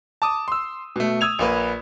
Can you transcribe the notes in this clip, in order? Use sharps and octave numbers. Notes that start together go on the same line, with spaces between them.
A5 D6 D#6
C6 E6
B2 A3
D#6 E6 G#6 F7
A#1 A#3 B4